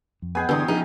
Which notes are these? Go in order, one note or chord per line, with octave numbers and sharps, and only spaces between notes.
F2
B3 G#4 G5 G#5
E2 G2 D3 E3 D#6
A#1 C#3 F3 D#4